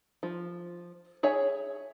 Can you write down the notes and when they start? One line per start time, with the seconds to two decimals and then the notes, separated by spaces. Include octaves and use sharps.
0.23 F3
1.23 G#4 C#5 E5 G#5